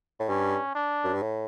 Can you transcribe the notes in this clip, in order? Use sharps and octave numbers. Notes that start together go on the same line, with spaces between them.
A2
G2 C#4
D4
F#2
G2
A2